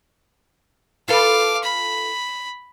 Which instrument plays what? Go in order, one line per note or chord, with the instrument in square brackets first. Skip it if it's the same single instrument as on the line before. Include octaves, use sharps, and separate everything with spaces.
[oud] F4 A4 B4 [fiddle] F5 D6
[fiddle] B5